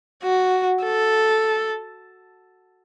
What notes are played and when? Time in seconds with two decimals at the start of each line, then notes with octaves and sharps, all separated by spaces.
0.23 F#4
0.83 A4